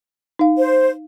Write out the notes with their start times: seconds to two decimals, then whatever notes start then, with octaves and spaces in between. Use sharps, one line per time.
0.39 D#4 F5
0.58 C5